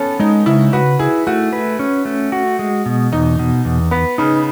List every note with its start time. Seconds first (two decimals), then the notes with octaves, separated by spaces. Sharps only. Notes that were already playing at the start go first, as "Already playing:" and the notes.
Already playing: B3 C#4 A4
0.20 G#3 D#4
0.46 C#3 E4
0.73 F#4 B4
0.99 E4 G#4
1.27 A3 F#4
1.53 B4
1.79 C#4
2.05 A3
2.32 F#4
2.59 G#3
2.86 B2
3.12 E2 D#4
3.39 B2
3.65 E2
3.91 B3 B4
4.18 C#3 D#4